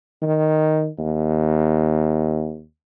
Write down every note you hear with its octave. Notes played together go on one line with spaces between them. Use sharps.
D#3
D#2